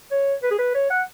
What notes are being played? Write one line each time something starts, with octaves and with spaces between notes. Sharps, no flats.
C#5
B4
G#4
B4
C#5
F#5